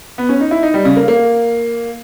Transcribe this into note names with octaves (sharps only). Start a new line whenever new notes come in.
B3
C#4
D#4
E4
D#4
G3
C#3
A#3
A#3